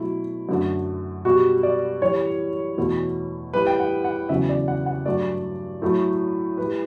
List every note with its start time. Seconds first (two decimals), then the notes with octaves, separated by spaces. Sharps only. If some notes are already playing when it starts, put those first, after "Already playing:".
Already playing: B2 F#3 A3 E4
0.49 F#2 D3 A3
1.25 B2 G3 F#4
1.63 D5
2.02 A2 E3 G3 C#5
2.78 E2 B2 A3
3.54 A2 G3 B4
3.67 G5
3.80 F#5
4.04 F#5
4.29 E2 C#3 F#3 E5
4.49 D5
4.68 F#5
4.86 F#5
5.06 G2 F#3 A3 D5
5.82 A2 F#3 A3
6.58 A2 G3 B4